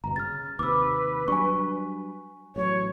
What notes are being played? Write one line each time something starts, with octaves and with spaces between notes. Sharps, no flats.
G1 B2 A#5
C#3 F6 A6
D#2 C3 B4 D6 E6
F#3 G3 D4 G#5 C#6
A1 F#3 C#5